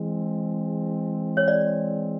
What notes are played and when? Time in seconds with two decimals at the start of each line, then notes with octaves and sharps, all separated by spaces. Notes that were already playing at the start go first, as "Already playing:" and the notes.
Already playing: E3 G#3 C4
1.37 C#5
1.48 D5